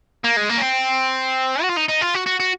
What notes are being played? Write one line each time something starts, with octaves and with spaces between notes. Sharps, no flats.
A#3
G#3
A#3
C#4
C4
F#4
F4
D#4
D#4
F4
F#4
F#4
F#4